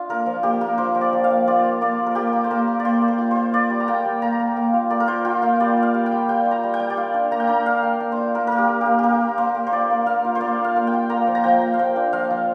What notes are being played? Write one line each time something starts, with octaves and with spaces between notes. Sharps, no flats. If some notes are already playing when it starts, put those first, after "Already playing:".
Already playing: D4 F4
A#3 A#4
F3
A#3 G4
A#3 A#4
F3 C5
F3
D5
F3
F5
A#3
F4 D5
F4
A#3 D5
F4
A#4
A#3 G4
A#3
C5
A#3 A#4
A#3
D5
A#3 C5
A#3
C5
F4
F4 C5
F4 D5
G3
A#5
A#3 G5
G3
A#3 A#5
A#3
A#3
F4
A#3 D5
A#4
F4 C5
F4 G5
A#3 F5
G3 D5
F4
F5
G3
G5
G3
G3 G5
F4
A#5
G3
G5
G3
D5
F4 F5
D4
A#3 A#5
G5
D4 A#5
D4 F5
A#3
D4
C5
F4
A#3 A#4
A#3 A#4
G4
A#3
A#3 G4
A#3 G4 A#4
A#3
A#3 C5
A#3
C5
F4 D5
A#3
A#3 F5
F4
C5
A#3 D5
F4
F5
A#3
G5
F4
A#3 A#5
F3
A#5
F3 G5
A#3
F5
F3 G5
D4
F3 F5
F3